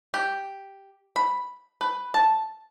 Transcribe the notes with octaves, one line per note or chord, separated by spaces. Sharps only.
G4
B5
B4
A5